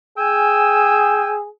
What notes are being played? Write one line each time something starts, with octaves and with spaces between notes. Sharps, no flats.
G#4 G5 G#5 E6